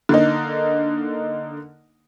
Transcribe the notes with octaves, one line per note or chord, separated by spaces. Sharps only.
D3 A#3 D#4